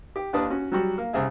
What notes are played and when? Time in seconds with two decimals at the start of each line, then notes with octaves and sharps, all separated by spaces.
0.16 G4
0.33 D#2 D4 B4 A5 D#6
0.50 C#4 F#4
0.72 F#3 G3 F#4
0.98 A#3
1.13 C2 C#3 G#4 E5